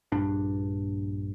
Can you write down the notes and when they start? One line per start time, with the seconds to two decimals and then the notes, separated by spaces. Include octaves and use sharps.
0.12 A#1 G2 D4